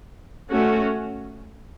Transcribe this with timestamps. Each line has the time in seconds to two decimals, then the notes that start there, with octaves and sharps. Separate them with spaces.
0.49 A3 C#4 F#4